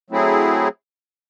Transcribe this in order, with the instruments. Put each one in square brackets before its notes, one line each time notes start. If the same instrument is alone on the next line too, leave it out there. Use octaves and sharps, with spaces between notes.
[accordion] F#3 A3 C4 E4 G#4